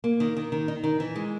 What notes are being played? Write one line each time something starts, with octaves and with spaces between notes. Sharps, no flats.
A#3
D#3
D#3
D#3
D#4
D#3
E3
G#3